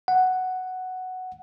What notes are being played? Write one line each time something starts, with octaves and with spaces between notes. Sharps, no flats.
F#5